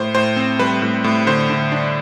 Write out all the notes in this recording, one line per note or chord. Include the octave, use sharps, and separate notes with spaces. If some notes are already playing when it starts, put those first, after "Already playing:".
Already playing: A2 C5
A2 C5
C4
G3 B4
A2
A2
D3 C5
D3
D4